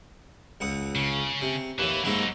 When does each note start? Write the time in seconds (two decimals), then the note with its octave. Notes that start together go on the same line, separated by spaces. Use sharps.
0.60 C#2 F#5 D#6
0.96 C#3
1.42 C3
1.79 D#2 A2 E3
2.05 G#2 F#3 A#3 D#4 E4